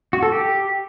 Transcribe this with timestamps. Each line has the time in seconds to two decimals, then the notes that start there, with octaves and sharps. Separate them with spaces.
0.13 F#4
0.23 A4
0.32 G4